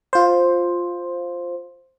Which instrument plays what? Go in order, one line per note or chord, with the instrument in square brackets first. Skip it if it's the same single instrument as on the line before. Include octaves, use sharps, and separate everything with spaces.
[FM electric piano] F4 C5